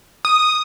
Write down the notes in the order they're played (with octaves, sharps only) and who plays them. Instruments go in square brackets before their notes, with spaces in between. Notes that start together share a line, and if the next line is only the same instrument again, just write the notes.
[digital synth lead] D#6